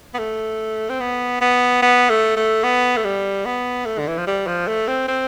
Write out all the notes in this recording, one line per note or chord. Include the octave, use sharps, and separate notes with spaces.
B3
A3
C4
B3
B3
B3
A3
A3
B3
A3
G3
B3
A3
D3
E3
F3
G3
F3
A3
C4
C4